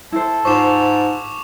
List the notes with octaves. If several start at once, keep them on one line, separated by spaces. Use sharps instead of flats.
E4 A4 C5
G#2 F4 C5 C#6 D6 E7